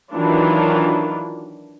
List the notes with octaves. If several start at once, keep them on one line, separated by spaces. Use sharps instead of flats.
D#3 E3 F#3 D4 F4